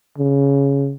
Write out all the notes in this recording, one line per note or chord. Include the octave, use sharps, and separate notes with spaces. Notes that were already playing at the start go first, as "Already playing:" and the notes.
C#3